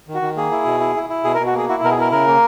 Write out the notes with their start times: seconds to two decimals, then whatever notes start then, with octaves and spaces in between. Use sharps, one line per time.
0.08 D#3
0.14 F#4
0.22 D#3
0.36 A#3 G#4
0.51 E4
0.65 B2
0.80 E4
0.96 E4
1.09 E4
1.24 B2 G#4
1.35 A#4
1.39 B2
1.46 F#4
1.53 A#3 G#4
1.69 E4 F#4
1.83 B2 A#4
1.91 G#4
1.97 E4 A#4
2.11 C#3 A#4
2.27 A#3